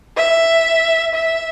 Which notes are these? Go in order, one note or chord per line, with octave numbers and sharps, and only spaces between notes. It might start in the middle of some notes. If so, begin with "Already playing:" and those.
E5
E5